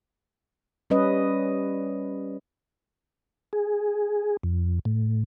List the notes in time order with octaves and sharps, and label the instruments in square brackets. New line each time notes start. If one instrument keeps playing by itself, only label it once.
[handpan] G3 C#4 B4 D#5
[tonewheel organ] G#4
F2
A2